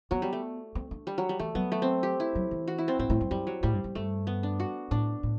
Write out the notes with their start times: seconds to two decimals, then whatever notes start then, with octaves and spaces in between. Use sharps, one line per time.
0.11 F#3 B3
0.22 G3
0.33 A3
0.75 C4
0.91 D4
1.07 G3
1.18 F#3
1.29 G3
1.40 E3 A3
1.55 F#3 B3
1.72 A3
1.82 C4
2.03 G4
2.20 E4
2.35 F#3
2.51 E3
2.68 F#4
2.78 E4
2.88 C4
2.99 A2 C4
3.10 A2
3.21 F#2
3.31 F#2 G3
3.47 F#3
3.63 A2 G3
3.74 G2
3.84 G2
3.95 G2 A3
4.27 B3
4.43 D4
4.60 F#4
4.91 A2 D4
5.23 A2